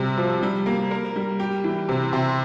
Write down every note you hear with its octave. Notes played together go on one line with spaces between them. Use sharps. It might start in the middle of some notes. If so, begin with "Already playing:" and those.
Already playing: C3 G3
F3
G3
A#3
A#4
G3
G4
E3
C3
C3